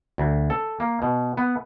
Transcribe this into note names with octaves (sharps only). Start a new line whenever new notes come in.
D2
A4
A#3
B2
B3